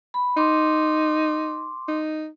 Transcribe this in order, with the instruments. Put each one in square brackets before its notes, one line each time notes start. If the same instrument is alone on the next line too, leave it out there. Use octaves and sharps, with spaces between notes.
[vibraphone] B5
[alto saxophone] D#4 [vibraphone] C6 D6
[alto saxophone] D#4